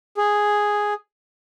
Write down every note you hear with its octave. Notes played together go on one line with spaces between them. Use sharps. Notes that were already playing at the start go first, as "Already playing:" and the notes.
G#4